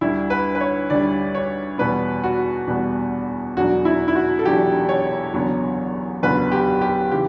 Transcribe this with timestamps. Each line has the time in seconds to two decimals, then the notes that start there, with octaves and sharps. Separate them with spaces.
0.01 D2 D3 G3 E4
0.30 B4
0.55 B4
0.61 C#5
0.90 D2 D3 G3 D5
1.35 C#5
1.78 E2 B2 G3 B3 B4
2.23 F#4
2.68 E2 B2 G3 B3
3.56 E1 E2 D3 F#3 F#4
3.85 E4
4.08 E4
4.16 F#4
4.39 A4
4.45 E1 E2 D3 F#3 G4
4.89 C#5
5.33 F#1 E2 D3 F#3 B3
6.23 F#1 E2 D3 F#3 B3 B4
6.52 G4
6.81 G4
7.11 C#3 E3 G4